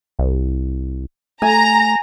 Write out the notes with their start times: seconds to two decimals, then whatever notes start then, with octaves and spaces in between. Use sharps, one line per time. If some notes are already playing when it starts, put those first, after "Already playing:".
0.19 C2
1.42 A3 G#5 A#5